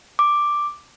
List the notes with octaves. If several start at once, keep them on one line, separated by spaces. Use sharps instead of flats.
D6